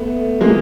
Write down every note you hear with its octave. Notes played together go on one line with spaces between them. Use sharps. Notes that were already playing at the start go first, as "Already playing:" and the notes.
Already playing: A3 B3
G#3 A#3